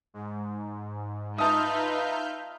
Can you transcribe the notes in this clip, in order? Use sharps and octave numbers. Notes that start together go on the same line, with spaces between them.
G#2
D#4 F4 B4 E5 A5 D#6 F6 G6